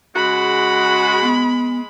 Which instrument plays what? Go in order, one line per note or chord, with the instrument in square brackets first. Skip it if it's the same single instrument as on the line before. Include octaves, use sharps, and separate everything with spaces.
[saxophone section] C#3 F#4 [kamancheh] G#3 B5
[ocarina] B3